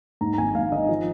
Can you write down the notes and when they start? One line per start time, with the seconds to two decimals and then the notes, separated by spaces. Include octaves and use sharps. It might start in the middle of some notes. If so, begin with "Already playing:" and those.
0.21 G#2 A#5
0.34 A#5
0.38 G#1 G#5
0.55 G#1 F5
0.72 D#3 D#5
0.89 F3